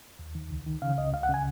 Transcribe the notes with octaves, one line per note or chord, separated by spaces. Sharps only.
D#2
D#3
C#2
D#3
C#3 F5
C#2 D#5
C#2 F5
F#5
C#3 G#5